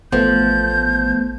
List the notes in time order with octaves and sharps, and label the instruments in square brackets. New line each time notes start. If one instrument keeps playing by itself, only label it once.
[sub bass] A1 [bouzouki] F3 [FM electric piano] A3 B3 [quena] G6